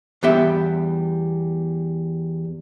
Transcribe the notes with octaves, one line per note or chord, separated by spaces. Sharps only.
E2 G3 B3 G4 E5 G5